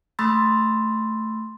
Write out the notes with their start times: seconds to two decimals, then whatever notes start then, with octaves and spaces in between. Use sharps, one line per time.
0.19 A3 B5 C6 E6 A6